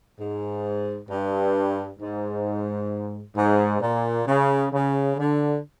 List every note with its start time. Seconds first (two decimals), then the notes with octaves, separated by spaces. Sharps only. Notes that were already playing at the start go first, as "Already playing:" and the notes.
0.19 G#2
1.09 G2
1.99 G#2
3.36 G#2
3.81 A#2
4.27 C#3
4.72 C#3
5.17 D3